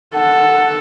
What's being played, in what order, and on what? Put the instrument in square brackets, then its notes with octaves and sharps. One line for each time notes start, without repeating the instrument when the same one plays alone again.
[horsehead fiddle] A4 [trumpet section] F#5